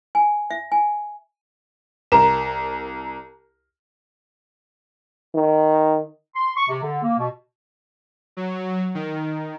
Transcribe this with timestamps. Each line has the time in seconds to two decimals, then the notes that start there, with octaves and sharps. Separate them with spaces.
0.15 G#5
0.50 E5
0.72 G#5
2.12 C2 A#4 A#5 E7
5.35 D#3
6.36 C6
6.57 C#6
6.69 C3
6.84 D3
7.02 A#3
7.18 B2
8.37 F#3
8.95 D#3